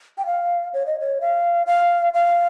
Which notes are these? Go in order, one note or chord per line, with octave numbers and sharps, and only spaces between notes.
G5
F5
C#5
D#5
C#5
F5
F5
F5